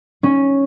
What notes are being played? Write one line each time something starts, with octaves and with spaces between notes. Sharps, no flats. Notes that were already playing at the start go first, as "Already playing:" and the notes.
C#4